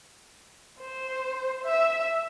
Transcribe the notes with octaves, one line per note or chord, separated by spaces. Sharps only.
C5
E5